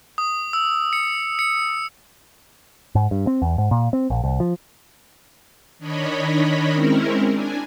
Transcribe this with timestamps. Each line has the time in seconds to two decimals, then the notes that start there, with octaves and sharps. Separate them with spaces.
0.18 D#6
0.53 E6
0.93 C#7
1.39 C#7
2.95 G#2
3.11 G2
3.27 C4
3.42 E2
3.58 G#2
3.71 A#2
3.93 C4
4.10 A#1
4.24 C2
4.40 F3
5.79 D#3 D4 C#5 D#5 B5
6.72 G#3 C4 C#4 E4 A#4
7.29 D4 G#5